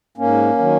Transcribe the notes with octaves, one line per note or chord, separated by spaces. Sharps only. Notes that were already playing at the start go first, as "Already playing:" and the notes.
G#2 A#3 C#4
D#3 F#3